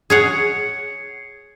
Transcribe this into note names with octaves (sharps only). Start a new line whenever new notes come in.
G#4 C#5 F#5 G#6 C7 C#7